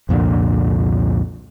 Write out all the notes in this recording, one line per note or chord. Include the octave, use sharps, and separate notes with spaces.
C2 F2 A#2 D3